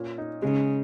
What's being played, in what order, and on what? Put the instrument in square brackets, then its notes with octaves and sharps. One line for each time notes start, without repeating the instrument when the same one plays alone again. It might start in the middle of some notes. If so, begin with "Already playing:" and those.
Already playing: [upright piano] A#2 C#4
D#4
[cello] C#3 [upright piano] G#3